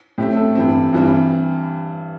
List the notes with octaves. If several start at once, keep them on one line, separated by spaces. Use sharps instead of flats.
A2 A3 C4 G4
A4
G2 E3 C4
G2 E3 G3 C4